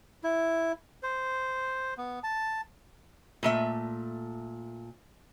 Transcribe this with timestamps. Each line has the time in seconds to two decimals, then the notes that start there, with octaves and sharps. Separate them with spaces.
0.24 E4
1.03 C5
1.97 B3
2.23 A5
3.43 A#2 A3 E5